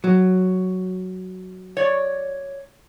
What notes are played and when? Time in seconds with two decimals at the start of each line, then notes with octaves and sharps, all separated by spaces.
0.04 F#3
1.77 C#5 D5